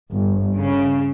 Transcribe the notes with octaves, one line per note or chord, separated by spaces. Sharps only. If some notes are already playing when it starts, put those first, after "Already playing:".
G1
C#3